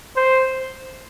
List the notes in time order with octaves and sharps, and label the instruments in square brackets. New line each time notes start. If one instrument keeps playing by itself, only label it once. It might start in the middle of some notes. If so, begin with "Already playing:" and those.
[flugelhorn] C5